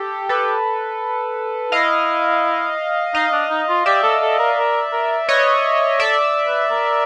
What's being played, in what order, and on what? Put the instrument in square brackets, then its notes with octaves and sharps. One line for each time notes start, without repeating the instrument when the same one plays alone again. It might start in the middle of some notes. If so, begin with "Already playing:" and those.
Already playing: [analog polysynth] G4 A4
[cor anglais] G4 [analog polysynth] A4 B4
[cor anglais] E4 [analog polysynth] D#5 F5
[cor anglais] D#4 [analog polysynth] D#5 F5
[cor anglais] D4
D#4
F4
[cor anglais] G4 [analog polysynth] D5 E5
[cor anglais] A4
A4
A#4
A#4
A#4
[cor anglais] B4 [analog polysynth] C#5 D#5
[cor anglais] A4 [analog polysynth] D5 E5
[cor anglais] B4
A#4